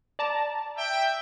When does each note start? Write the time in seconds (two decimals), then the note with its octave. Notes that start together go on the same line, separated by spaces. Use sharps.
0.19 D5 A5 A#5
0.77 E5 G5